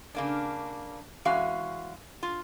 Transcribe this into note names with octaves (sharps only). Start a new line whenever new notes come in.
C#3 A#3 D4
E3 G#3 C#4 F#4 F5
F4